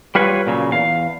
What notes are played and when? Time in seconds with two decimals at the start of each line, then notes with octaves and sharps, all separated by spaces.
0.15 G3 F4 B4 C#5
0.47 A#2 C#3 F#3
0.71 E2 F5